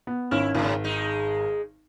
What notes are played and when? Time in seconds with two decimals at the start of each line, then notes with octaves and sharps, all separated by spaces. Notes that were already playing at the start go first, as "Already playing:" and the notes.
0.07 B3
0.31 G#1 C#4 E4 F6
0.55 G#1 A2 C#3
0.84 G#3 D#4